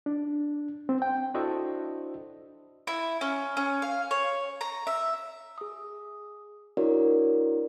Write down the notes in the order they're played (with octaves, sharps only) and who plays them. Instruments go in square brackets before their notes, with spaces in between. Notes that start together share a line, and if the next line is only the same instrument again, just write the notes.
[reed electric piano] D4
C4
G5
[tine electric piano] D4 E4 F#4 A4 C5 D#5
[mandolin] E4
C#4
C#4
F5
C#5
A#5
E5
[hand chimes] G#4 D#6
D4 E4 F#4 A#4 C#5 D5